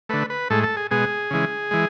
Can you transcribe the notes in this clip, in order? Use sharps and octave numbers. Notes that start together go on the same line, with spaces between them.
D3 A3 B4
B4
A2 G#3 A4
A4
G#4
B2 G#3 G#4
C#3 E3 G#3
E3 G#3